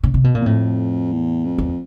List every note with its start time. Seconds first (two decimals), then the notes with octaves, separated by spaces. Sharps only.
0.04 C#3
0.14 C3
0.24 B2
0.35 A#2
0.41 E2
0.46 F2 A2
1.12 E2
1.45 F2
1.58 E2